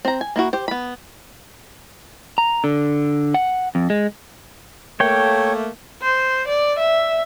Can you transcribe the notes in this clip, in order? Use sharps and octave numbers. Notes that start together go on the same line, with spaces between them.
C4 A#5
G#5
A#3 E4 F#4
G4 C5
B3 B5
A#5
D3
F#5
F2
G#3
A3 A#3 C#5 G5
C5
D5
E5